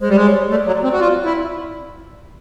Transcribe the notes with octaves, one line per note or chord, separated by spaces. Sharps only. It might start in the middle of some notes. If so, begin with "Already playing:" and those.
G#3 C5
G3
G#3
C#5
A3 D5
F#3
C4
F#4
F4
E4